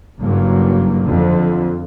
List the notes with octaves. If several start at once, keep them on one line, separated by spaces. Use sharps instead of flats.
F#1 G2 F#3 A#3
F2 D3